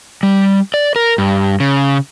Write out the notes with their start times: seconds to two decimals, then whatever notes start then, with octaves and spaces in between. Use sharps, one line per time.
0.23 G3
0.74 D5
0.96 A#4
1.18 G2
1.60 C#3